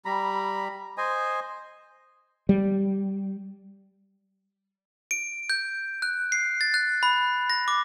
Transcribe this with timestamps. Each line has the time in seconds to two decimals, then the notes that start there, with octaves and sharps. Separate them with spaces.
0.05 G3 A#5 B5
0.98 C5 D#5 G#5
2.49 G3
5.11 D7
5.50 G6
6.02 F#6
6.32 C7
6.61 A6
6.74 F#6
7.03 B5
7.50 A#6
7.68 D6